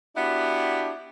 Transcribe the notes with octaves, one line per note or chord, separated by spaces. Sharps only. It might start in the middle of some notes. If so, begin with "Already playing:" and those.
B3 D4 E4 F#4 G4